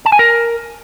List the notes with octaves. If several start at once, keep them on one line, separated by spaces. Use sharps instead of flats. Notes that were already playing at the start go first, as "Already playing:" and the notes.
A5
G#5
A#4